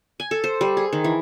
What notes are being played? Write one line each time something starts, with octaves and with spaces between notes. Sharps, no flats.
G#5
A4
C5
G3
G#4
D#3
E3